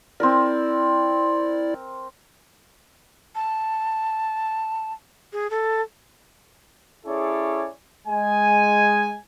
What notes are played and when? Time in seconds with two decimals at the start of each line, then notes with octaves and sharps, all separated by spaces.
0.20 C4 E4 A#4 D5
3.35 A5
5.33 G#4
5.50 A4
7.05 C#4 E4 G#4 A4 C#5 D5
8.07 G#3 G#5